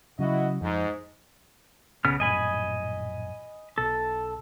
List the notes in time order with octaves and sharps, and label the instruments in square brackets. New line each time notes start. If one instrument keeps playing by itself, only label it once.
[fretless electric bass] C#3 F#3 [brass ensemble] E4 F#4 D#5
[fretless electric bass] F2 [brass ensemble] G#2
[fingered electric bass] B1 [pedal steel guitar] C#3 B3 F6
[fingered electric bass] A#1 F#2 A2 [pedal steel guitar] D#5 G#5 B5
[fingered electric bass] B1 [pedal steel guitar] A4